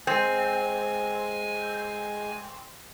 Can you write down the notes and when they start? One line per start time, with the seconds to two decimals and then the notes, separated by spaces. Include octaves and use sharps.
0.07 G#3 C4 G#5